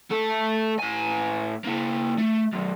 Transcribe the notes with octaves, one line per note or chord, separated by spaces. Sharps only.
A3 A4
A2 G#5
A#3 E4
A3
B1 F#2